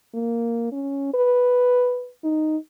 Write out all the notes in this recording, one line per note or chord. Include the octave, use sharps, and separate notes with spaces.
A#3
C#4
B4
D#4